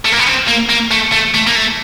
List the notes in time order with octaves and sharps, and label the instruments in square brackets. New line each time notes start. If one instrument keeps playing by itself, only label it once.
[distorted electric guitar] A3
A#3
B3
C4
A#3
A#3
A3
A3
A3
A#3
A3